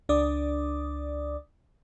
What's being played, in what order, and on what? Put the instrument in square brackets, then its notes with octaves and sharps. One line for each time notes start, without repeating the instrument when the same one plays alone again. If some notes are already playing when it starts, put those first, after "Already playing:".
[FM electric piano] C#2 D4 D5 D6 D#6